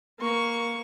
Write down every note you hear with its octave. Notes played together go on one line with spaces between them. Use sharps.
A#3 C#6